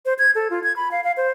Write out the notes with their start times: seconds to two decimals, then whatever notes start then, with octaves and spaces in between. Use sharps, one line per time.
0.06 C5
0.19 G#6
0.35 A4
0.50 F4
0.64 G#6
0.76 B5
0.92 F5
1.04 F5
1.17 C5